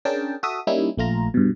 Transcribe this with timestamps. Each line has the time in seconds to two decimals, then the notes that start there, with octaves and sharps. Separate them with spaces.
0.05 C#4 D4 G#4 A#4 G5 A5
0.43 F#4 A4 E5 D#6
0.67 G3 A#3 C#4 D#4 E4
0.97 A#1 A3 F4 A#5
1.34 G2 B2